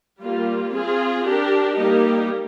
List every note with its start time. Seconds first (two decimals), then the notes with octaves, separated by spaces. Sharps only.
0.21 G3 A#3 F4
0.73 C4 F4 G#4
1.25 D4 G4 A#4
1.75 G3 A#3 D#4 G4 A#4